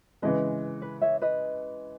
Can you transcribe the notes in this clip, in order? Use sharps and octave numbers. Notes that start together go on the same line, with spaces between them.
C#3 E3 G#3 B4 D#5
B4
C#5 E5
B4 D#5